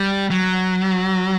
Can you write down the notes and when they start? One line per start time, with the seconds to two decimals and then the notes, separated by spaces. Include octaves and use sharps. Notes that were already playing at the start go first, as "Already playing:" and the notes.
Already playing: G3
0.30 F#3